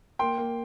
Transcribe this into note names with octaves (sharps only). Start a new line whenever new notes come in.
A#3 G5 C6
A#3